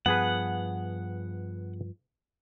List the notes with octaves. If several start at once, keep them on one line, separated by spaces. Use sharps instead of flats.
G2 F3 B3 G#4 B4 F#5